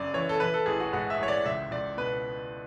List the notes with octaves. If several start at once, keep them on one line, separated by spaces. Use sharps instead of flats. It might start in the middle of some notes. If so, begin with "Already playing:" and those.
Already playing: F#1 F#2 C#3 D5
E3 C#5
A4
E3 B4
A4
A1 G#4
F#4
G#2 F#4
E5
A1 C#5
D5
C#2 E5
C#2 D5
B2 B4